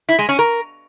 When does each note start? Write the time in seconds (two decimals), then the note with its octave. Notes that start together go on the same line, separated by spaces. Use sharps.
0.09 E4
0.19 G#3
0.29 C#4
0.39 A#4